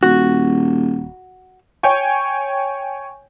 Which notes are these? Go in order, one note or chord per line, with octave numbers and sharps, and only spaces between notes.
D#1 F#4
C#5 G5 G#5